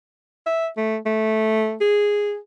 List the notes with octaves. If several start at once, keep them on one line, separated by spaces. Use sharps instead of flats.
E5
A3
A3
G#4